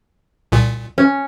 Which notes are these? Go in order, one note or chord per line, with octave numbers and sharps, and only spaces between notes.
C2 A#2
C#4